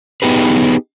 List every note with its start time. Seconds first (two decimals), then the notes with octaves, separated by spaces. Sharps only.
0.22 B3 D#4 G4 G#4 B4